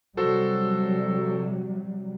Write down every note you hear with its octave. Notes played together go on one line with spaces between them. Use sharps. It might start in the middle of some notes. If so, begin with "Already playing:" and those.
C3 F#3 G3 F#4 A4 C5